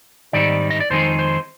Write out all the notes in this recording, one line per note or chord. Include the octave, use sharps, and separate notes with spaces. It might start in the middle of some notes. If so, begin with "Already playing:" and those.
G#2 D#3 G3 C4 D#4 D5
D#5
D5
F2 D#3 G#3 C4 D#4 C5
C5